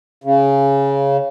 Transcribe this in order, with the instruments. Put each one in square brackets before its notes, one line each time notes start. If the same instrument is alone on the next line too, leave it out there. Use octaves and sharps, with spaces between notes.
[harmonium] C#3